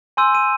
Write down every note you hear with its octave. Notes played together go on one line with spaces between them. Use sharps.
G#5 C6 E6 G6 D#7
D#7